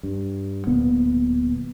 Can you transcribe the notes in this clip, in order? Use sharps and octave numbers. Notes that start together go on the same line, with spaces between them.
G2
D1 A#2 B3